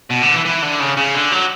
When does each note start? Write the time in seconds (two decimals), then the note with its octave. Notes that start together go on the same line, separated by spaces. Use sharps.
0.10 B2
0.22 D3
0.34 E3
0.45 E3
0.62 D3
0.80 C#3
0.97 C#3
1.15 D3
1.32 F#3